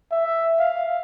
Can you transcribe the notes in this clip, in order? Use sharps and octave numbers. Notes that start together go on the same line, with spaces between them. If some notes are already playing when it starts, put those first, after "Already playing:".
E5
F5